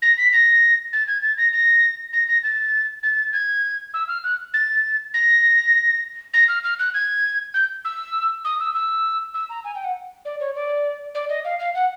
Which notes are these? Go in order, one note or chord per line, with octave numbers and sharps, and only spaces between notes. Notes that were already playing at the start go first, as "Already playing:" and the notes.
A#6
B6
A#6
A6
G#6
A6
A#6
A#6
A#6
A#6
A6
A6
G#6
E6
F6
F#6
A6
A#6
A#6
F6
F6
F#6
G#6
G6
E6
D#6
E6
E6
E6
A#5
G#5
G5
F#5
D5
C#5
D5
D5
D#5
F5
F5
F#5